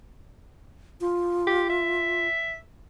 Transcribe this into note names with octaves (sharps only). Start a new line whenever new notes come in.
F4
G4
E5